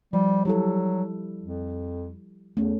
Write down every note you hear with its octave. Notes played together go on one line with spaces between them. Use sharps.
F3 G3
F#3 G3 E4 A4
F2
E2 A3 C#4